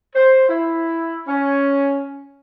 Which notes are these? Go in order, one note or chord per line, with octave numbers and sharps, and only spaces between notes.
C5
E4
C#4